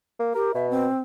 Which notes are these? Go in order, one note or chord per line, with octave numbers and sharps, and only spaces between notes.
A#3
G4 A#4
B2 E5
C4